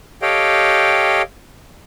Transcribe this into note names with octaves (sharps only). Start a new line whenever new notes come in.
G4 A4 C#5 D#5 F5 G5